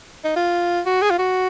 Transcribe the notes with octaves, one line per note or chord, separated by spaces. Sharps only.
D#4
F4
F#4
G#4
F4
F#4